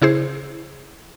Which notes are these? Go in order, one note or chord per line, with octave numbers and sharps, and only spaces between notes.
C#3 E4 G#4 C5